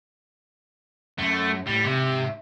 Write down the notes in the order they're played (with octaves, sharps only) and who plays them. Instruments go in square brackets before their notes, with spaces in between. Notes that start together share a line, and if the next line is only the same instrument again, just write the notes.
[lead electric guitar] F#2 [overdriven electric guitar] A3
[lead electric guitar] A2 [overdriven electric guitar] G3
[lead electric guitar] G#2 E5 [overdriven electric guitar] C3